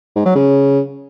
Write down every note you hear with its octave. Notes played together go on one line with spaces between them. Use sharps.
G#2
F#3
C#3